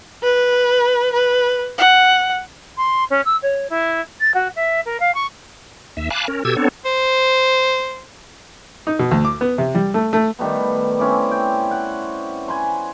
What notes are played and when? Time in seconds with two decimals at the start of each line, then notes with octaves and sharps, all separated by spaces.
0.22 B4
1.13 B4
1.78 F#5
2.77 C6
3.10 C#4
3.25 E6
3.42 C#5
3.69 E4
4.20 A6
4.34 F#4
4.56 E5
4.85 A#4
5.00 F5
5.14 C#6
5.97 D#2 E5
6.11 F5 G#5 A5 B5 D6 F#6
6.28 C#4 A#4
6.45 B2 G4 A4 E6 G#6
6.56 B3 C4 D4 A4 C#5
6.85 C5
8.87 D#4
8.99 B2
9.11 D2
9.25 D6
9.41 B3
9.58 C3
9.75 G3
9.94 A3
10.13 A3
10.39 D#3 G3 A3 B3
10.99 C4 C#4 E4 D5
11.31 G5
11.71 F#5
12.48 G#5 B5 C6